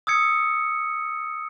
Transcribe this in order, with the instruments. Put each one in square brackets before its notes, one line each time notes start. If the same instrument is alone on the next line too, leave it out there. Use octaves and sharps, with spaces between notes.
[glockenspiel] D#6 E6 G#6 C#7